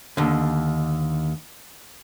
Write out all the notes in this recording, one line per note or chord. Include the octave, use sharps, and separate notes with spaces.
D#2 D3